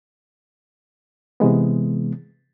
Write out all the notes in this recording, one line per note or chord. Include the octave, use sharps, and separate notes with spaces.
C3 E3 G#3 B3